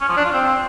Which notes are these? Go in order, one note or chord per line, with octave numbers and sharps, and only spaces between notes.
C#4
F3
D4
F4
C4